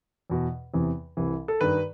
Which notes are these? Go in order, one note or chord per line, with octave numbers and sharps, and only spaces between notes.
E2 B2
E2 C3 E3
C2 C3 E3
A4
G2 D#3 B4